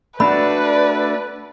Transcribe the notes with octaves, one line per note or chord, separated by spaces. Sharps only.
A3 D4 F#4 B4 D5 B5